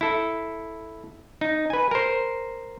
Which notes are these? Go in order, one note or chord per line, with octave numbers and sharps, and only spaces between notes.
E4 A4
D#4
B4 G#5
A#4 C5